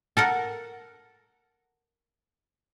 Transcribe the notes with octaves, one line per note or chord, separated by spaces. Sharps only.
A4 A#4 F#5